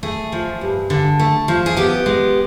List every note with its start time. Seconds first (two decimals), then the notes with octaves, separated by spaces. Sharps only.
0.03 A3 G#4
0.32 F3
0.61 G2
0.90 D3
1.20 A3
1.48 F3
1.66 G#4
1.77 B3 G4
2.06 G#3